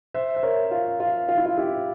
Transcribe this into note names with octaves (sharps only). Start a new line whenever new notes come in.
C5 E5
E5
A#4 C#5
F4
F4
F4
E4
F4
E4 G4